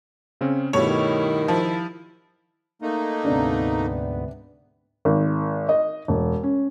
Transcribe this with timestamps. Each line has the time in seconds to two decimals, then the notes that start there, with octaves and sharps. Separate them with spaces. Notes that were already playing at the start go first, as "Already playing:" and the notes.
0.41 C#3 C4 C#4
0.73 G2 B2 D#3 G3 A3 E4 C#5
1.48 F3 E4
2.82 A3 A#3 D#4
3.25 D2 G#2 C3 B3 D4
5.05 G#1
5.69 D#5
6.08 E1
6.43 C#4